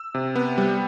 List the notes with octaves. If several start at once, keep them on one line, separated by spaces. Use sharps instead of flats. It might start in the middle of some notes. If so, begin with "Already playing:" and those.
Already playing: E6
C3
B3
G3